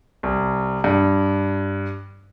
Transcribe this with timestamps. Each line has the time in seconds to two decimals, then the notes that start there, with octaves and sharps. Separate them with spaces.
0.23 C2
0.84 G2